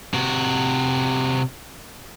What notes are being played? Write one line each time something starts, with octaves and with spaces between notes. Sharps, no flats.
C3 F#4